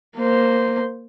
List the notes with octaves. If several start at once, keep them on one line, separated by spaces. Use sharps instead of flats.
A#3 C5